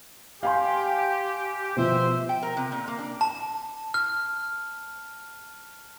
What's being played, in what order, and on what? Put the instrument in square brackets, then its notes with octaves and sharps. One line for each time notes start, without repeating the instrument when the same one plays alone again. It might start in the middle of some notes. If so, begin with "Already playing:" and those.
[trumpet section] G4 [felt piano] F5 G#5 C6
[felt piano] B2 F3 [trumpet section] C5 E5
[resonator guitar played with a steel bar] G5
A#4
C3
A#2
A#3
D4
[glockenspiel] A5
F6